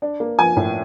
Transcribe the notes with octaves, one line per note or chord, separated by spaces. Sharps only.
D4
A#3
F3 G#5
A2